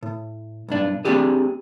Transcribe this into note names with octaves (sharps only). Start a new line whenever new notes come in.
A2
B1 G2 D4
A3 B3 C4 D4 G4 G#4